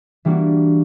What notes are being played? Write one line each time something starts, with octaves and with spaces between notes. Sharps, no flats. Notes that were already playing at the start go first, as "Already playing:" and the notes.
E3 G3 A#3 D4 F#4